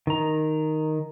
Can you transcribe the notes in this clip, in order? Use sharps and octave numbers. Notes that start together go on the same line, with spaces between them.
D#3 A#5